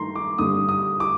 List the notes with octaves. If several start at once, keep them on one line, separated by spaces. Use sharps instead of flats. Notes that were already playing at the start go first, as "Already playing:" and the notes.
Already playing: G2 D#3 A3 A#5 C6
D6
G2 D3 G3 D#6
D#6
D6